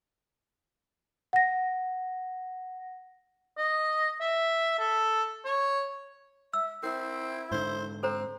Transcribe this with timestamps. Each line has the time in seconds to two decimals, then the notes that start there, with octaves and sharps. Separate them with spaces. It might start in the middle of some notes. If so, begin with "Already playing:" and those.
1.33 F#5 A#6
3.57 D#5
4.21 E5
4.79 A4
5.45 C#5
6.53 E5 E6
6.83 C4 E4 A#4
7.52 G#2 D3 C5
8.03 C4 A4 C5 A#5